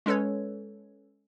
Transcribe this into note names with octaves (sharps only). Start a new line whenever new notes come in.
G#3 C#4 A4 B4 C#5